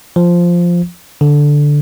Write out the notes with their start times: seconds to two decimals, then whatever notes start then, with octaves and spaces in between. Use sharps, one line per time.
0.16 F3
1.21 D3